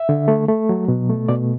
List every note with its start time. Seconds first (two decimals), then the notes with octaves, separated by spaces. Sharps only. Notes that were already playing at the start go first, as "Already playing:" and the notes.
Already playing: E5
0.09 D3
0.28 A3
0.48 A3
0.69 F#3
0.88 B2
1.09 A3
1.28 B2 D5